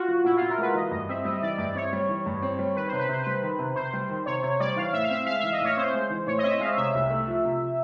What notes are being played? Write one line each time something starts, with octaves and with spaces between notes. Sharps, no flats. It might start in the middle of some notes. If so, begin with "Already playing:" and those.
Already playing: F4 F#4
F3
A#2 E4
F4
A#2
A#4
G#3 B4
E3 D#5
G2 D#5
C4 E5
G3 D#5
E3 D5
G2 D5
C4 C#5
G3
E3
G2
C4
G3
D#3 B4
C3 C5
B4
C3 C5
G3 B4
D#3
C3
C3 C5
G3
D#3
C3 C#5
C3 C#5
G3 D5
E3 F5
A2 E5
F5
C4 E5
G#3 F5
E3 E5
D#5
A2 C#5
C4 C5
G#3
E3
A2 C#5
D#5
C4 E5
G#3 F5
C3 E5
C2
A3
F3
C3